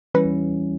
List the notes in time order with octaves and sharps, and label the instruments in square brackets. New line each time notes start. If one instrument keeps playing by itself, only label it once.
[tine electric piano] E3 G3 C#4 E4 [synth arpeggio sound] B4